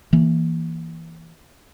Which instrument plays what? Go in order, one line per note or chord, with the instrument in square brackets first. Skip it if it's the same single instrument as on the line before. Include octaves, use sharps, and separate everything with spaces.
[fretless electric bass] E3 A#3